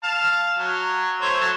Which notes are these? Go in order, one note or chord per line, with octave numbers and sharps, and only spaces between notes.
F5 A5
F#3
A3 C5 C#5
F#3 A5